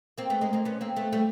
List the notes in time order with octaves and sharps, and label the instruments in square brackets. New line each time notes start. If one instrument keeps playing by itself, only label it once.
[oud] A#3 C4
A3 B3
G#3 A#3
A#3 C4
B3 C#4
A#3 C4
A3 B3
G3 A3